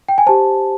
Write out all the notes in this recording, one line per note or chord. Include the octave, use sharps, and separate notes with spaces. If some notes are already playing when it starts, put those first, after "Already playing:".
G5
G#5
G4 C5 A5